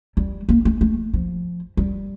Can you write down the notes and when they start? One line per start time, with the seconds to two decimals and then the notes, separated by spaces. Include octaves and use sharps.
0.17 G3
0.49 A#3
0.65 A3
0.81 A3
1.14 F3
1.77 G3